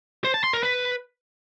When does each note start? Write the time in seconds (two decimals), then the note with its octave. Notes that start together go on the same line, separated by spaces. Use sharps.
0.24 C5
0.34 A5
0.44 C6
0.53 A#4
0.63 B4